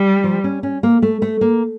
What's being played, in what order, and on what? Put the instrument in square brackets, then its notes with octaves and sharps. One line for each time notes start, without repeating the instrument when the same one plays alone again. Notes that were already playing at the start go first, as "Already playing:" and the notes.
Already playing: [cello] G3
[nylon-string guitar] F3
C#4
C#4
A#3
A3
A3
A#3